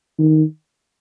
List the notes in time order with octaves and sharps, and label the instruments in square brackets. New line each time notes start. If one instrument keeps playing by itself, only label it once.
[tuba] D#3